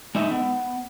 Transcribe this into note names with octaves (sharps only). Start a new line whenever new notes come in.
G#3 D#4 E5
B3